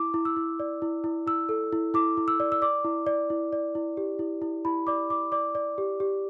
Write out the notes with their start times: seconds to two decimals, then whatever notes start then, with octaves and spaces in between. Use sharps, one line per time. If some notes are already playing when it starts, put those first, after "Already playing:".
Already playing: E4 D6
0.14 E4
0.25 E6
0.37 E4
0.60 D5
0.82 E4
1.04 E4
1.27 E4 E6
1.49 A4
1.73 E4
1.94 E4 D6
2.17 E4
2.28 E6
2.40 D5
2.52 E6
2.62 D5 D6
2.84 E4
3.07 D5
3.30 E4
3.53 D5
3.75 E4
3.97 G4
4.19 E4
4.42 E4
4.65 E4 B5
4.87 D5 D6
5.10 E4 D6
5.32 D5 D6
5.55 D5
5.78 G4
6.00 G4